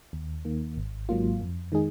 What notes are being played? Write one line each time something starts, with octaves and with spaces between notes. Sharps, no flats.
D#2
D#3 A#3
G#1
G#2 F#3 A#3 F4
F2
D#3 G#3 D#4 G#4